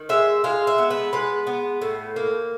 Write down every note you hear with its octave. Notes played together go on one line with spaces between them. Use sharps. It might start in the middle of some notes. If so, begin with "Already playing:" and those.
Already playing: D#3
G#3 E5
G#3 F5
E5
B3
B4
G#3 B4
B3
A2
A#3